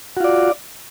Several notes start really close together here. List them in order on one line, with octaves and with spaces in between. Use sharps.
F#4 F4 D5